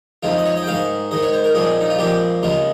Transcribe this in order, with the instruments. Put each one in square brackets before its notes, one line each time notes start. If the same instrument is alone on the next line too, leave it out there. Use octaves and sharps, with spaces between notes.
[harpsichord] F2 D#3 G#3 C4 F4
D#5
C#5
D#5
G5
G#2 D#3 G#3 F5
G#2 D#3 G#3 D#5
C#5
C5
A#4
A#2 F3 G#3 C4 G#4
D#4
F4
A#2 F3 G#3 C4 G4
D#2 C#3 G#3 F4